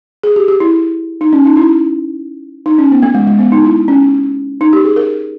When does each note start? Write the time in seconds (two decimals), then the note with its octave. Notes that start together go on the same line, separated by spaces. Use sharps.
0.23 G#4
0.36 G4
0.48 G4
0.60 E4
1.21 D#4
1.33 C#4
1.45 D#4
1.57 E4
2.66 D#4
2.78 C#4
2.91 B3
3.03 A#3
3.15 G#3
3.27 G#3
3.39 B3
3.52 D#4
3.64 E4
3.88 C#4
4.61 D#4
4.73 G4
4.84 G#4
4.96 A#4